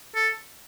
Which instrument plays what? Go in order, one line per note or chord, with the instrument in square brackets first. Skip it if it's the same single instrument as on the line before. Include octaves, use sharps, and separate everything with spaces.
[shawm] A4